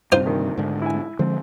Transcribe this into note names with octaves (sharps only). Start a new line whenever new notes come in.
G2 C3 D#4 F4 C5
D2 D#3
G#2 D3
E4 G#5
D3 F3 G#3 C4